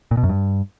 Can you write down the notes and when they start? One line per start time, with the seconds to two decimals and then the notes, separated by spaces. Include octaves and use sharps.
0.11 A#2
0.17 B2
0.23 F#2
0.29 G2